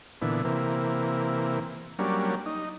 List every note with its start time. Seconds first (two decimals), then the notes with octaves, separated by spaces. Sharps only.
0.22 A#2 D3 E3 B3
0.45 C3 E3 A#3
1.99 F#3 G3 A#3 C#4 D4
2.46 D#4